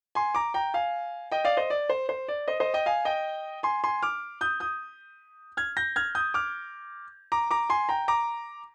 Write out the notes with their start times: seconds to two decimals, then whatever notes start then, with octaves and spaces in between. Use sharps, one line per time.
0.15 G#5 C6
0.35 A#5 D6
0.54 G5 A#5
0.74 F5 G#5
1.32 D#5 G5
1.45 D5 F5
1.57 C5 D#5
1.70 D5
1.90 C5
2.09 C5
2.28 D5
2.48 C5 D#5
2.60 C5 D#5
2.74 D#5 G5
2.86 F5 G#5
3.05 D#5 G5
3.63 G#5 C6
3.84 G#5 C6
4.03 D6 F6
4.41 D#6 G6
4.60 D#6 G6
5.57 F6 G#6
5.77 G6 A#6
5.96 F6 G#6
6.15 D#6 G6
6.34 D6 F6
7.32 A#5 D6
7.51 A#5 D6
7.70 G#5 C6
7.89 G5 A#5
8.08 A#5 D6